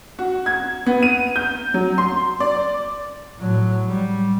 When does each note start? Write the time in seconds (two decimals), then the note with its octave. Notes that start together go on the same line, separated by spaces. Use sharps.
0.19 F#4
0.46 G#6
0.86 B3
1.03 D#7
1.36 G6
1.74 F#3
1.98 C6
2.40 D5
3.39 A2 F#3
3.87 G3